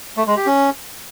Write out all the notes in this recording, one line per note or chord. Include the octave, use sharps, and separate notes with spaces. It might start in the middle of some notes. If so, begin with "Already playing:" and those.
A3
G#3
G4
C#4